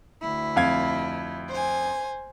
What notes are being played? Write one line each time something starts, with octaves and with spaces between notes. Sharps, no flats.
D2 E4
F2 F5 G#6
C5 G#5